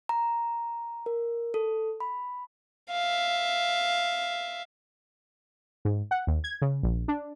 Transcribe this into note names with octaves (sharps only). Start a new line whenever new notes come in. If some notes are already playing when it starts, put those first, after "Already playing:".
A#5
A#4
A4
B5
E5 F5
G#2
F#5
D#2
G#6
C#3
A#1
D4